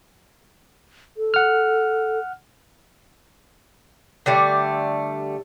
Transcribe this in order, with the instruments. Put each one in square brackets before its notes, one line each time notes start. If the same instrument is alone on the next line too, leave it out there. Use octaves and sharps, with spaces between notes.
[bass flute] A4
[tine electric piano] F#5 F6
[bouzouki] D3 G3 A3